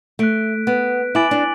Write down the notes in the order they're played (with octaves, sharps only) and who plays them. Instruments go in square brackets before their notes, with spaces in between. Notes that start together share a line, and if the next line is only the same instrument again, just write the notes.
[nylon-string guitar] A3 [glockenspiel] F#6 B6 D7
[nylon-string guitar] B3 [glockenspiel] F#6 B6 D7
[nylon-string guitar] E4 [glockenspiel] G#5 D6 A6 D7 F#7
[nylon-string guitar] D4